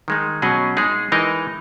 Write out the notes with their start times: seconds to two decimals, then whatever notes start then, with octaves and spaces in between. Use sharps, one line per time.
0.08 D#3 G#3 D#4
0.42 B2 F#3 C#4 G#4 D#5
0.77 G#3 D#4 G#4
1.12 E3 G#3 D#4 A#4 D#5